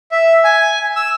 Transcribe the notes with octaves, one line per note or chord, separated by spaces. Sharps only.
E5
G#5
E6